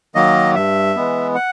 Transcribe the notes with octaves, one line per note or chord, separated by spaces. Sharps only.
D#3 F#3 A#3 D#5
G2 E5
E3 G#3 B3
F#5